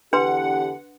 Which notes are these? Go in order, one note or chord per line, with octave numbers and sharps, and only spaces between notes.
E2 D3 D4 G4 B4 F#5 C6